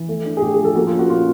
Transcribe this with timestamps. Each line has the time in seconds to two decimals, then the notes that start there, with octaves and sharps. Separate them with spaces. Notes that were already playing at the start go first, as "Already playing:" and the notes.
Already playing: E3
0.09 A3
0.26 D4
0.37 G#4
0.42 A2 G4
0.54 G#4
0.59 F3
0.64 A4
0.75 A#3 F#4
0.87 F4
0.93 C#4
0.99 F#4
1.10 A#2 F4